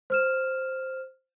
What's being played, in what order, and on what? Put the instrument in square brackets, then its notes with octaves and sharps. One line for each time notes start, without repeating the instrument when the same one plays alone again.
[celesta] C5 F6 E7